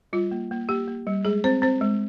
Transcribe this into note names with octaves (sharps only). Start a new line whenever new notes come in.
G3 F4
A#3
A#3
A#3 G4
A#3
G3
G#3 G#4
C4 C5
C4 C5
G#3